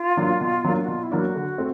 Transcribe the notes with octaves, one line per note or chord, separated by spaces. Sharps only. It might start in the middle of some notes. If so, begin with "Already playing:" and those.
Already playing: F4
F#3 A#3 D4
B2
F#3 A#3 D4
F#4
B2 F4
E4
F#3 A#3 D4
F#4
D3
A3 C4